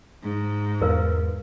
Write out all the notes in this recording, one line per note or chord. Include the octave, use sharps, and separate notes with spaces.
G#2
E2 A#4 B4 F5